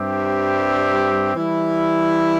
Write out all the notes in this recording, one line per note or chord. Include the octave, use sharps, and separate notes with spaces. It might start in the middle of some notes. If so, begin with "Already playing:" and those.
Already playing: G2 G3 C4 G4 E5
E3 G3 E4